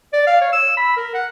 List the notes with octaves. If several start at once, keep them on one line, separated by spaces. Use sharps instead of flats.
D5
F5
C#5
E6
B5
A#4
F#5